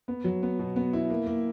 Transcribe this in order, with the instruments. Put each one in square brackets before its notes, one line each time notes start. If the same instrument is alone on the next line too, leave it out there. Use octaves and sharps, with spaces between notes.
[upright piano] B3
F#3
B3
B2
B3
E4
A#3
A#3